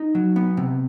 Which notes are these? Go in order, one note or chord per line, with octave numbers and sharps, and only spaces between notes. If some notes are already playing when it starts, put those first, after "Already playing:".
Already playing: D#4
F#3
B3
C3